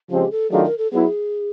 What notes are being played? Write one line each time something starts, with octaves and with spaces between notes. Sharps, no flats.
C#3 F3 G#3 C4 G4
A4
D#3 F#3 A3 D4 F4 G#4
A#4
A4
F#3 B3 E4 G#4